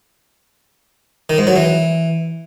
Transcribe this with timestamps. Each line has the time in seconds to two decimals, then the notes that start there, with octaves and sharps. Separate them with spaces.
1.30 D#3
1.38 G#2
1.47 F#3
1.56 E3